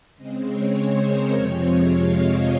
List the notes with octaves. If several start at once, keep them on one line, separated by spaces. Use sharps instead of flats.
C#3 G#3 C4 D#5
C#5
C5
A#4
F2 C3 F3 G#3 C4 C#5
F5
D#5